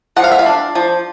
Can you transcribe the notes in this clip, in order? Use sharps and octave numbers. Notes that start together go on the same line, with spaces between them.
F3 F#5
F5
E5
F5
D4
F3